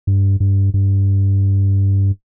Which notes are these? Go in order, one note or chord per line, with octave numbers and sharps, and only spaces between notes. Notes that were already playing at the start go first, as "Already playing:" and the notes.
G2
G2
G2